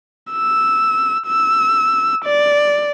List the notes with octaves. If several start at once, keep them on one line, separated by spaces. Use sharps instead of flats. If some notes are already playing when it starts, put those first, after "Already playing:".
E6
E6
D5